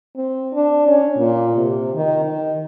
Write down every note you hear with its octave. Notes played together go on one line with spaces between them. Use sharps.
C4
D4
C#4
A#2
C3
D#3
D#3